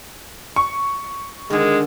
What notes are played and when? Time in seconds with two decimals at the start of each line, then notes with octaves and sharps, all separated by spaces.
0.56 C#6
1.50 D3 D#3 G#3